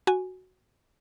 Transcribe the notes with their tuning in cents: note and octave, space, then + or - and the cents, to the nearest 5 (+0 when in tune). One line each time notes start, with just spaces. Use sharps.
F#4 +0 G#5 +0